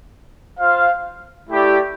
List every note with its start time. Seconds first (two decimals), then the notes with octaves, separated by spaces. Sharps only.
0.59 F4 C5 F5
1.48 A3 E4 G4 D5